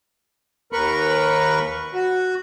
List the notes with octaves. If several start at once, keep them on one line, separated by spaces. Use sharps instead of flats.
D#2 A#4 B4 B5 C#6
F#4